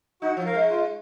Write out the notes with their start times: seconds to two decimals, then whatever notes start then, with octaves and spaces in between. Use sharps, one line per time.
0.22 D#4 F#4
0.37 F3
0.45 A#4 F5
0.54 G#3
0.70 F4